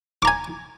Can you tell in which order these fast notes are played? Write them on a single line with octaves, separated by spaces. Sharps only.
D6 A#5 G#5